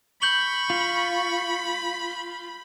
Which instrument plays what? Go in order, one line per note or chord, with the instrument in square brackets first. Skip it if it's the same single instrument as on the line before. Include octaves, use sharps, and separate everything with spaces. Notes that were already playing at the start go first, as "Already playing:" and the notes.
[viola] B5 [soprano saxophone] C#6 [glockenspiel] G6 F#7 G7
[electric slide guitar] F4